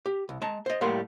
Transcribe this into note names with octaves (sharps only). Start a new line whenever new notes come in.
G4
C2
G#3 A5 A#5
C5 D#5
A2 G3 A#3 A#4 F#5 C6